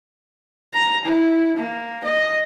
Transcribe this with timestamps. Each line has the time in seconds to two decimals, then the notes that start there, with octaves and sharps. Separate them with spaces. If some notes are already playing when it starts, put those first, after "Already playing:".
0.73 A#5
1.04 E4
1.56 A#3
2.04 D#5